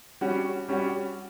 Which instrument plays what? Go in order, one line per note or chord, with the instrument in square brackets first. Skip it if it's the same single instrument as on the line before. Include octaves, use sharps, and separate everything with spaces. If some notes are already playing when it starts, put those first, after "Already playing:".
[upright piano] G3 C#4 F#4
G3 C#4 F#4